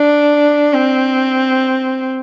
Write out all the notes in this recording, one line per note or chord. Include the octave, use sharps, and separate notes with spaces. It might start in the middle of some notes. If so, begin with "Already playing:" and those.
Already playing: D4
C4